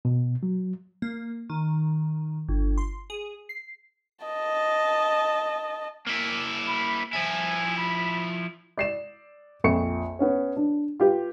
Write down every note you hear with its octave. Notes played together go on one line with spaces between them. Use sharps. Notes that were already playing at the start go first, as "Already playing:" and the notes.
B2
F#3
A#3
D#3
G1
C6
G#4
C7
D#5 A5
A#3 E4
B5
F3 E4 G#5
B5
D5 C7 E7
A#1 F2 C#6 C#7
B3 C#4 C#5
D4
F4 G4 B4